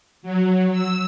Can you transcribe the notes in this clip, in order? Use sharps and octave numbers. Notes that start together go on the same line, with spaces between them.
F#3
E6